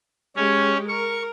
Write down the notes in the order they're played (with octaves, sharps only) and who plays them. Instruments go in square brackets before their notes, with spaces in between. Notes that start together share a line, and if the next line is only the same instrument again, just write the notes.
[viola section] G#3 G4 [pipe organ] C#4 C#5
[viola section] A#4 [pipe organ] C#6